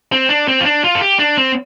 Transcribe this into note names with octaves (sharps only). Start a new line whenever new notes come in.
C4
D4
C4
F4
D4
F4
A4
G4
D4
C4